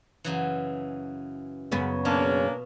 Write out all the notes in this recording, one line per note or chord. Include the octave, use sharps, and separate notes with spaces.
F#2 C#3 E3
F#2 C#3 B3
B2 A#3 C#4 D4 F4 A5